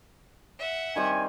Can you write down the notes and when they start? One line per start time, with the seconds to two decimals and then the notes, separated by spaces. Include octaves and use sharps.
0.59 E5 F#5
0.96 D#3 G3 C4 G#5